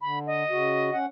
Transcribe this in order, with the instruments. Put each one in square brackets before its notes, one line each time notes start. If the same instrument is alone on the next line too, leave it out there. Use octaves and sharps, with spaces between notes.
[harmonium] D3 [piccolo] B5
[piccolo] D#5
[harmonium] C#3 F#4
C#4 F#5